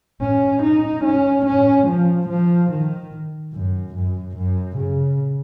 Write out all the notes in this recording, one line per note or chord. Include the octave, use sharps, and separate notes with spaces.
C#4
D#4
C#4
C#4
F3
F3
D#3
F#2
F#2
F#2
C#3